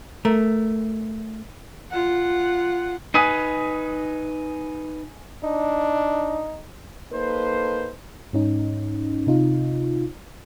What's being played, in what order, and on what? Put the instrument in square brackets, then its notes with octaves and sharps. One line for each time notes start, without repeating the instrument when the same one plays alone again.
[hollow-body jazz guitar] A3 A#4
[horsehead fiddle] F4 F#5
[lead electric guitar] D#4 B4 [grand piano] G#5 D#6 D#7
[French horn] D4 [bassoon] D#4
[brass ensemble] A#3 D#4 A4 B4 C5
[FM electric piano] G#2 C#4 D#4
C3 D#4 F4